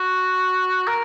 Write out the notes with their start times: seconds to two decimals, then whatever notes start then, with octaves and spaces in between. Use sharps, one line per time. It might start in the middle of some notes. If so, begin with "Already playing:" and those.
Already playing: F#4
0.87 A#4